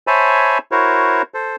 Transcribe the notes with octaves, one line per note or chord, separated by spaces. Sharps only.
C5 C#5 E5 G#5 A5 B5
E4 F#4 A#4 C5 C#5
A4 C5